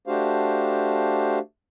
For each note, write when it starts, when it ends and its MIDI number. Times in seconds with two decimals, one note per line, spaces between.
0.07 1.39 57
0.07 1.39 62
0.07 1.39 66
0.07 1.39 67
0.07 1.39 72
0.07 1.39 77